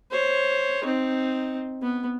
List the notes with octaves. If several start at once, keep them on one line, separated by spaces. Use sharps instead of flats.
C5 C#5
C4 D#4
B3